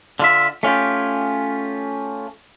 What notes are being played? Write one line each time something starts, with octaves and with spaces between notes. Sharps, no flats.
D3 F4 E5
A3 C#4 F4 G4